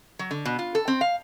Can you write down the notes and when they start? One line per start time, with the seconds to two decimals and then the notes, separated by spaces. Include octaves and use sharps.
0.19 F#3
0.31 D3
0.45 B2
0.59 F4
0.75 A4
0.88 C4
1.01 F5